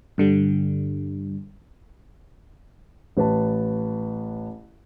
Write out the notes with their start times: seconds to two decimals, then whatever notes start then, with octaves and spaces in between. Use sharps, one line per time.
0.18 G2 D3 G3
3.17 A1 B4 A5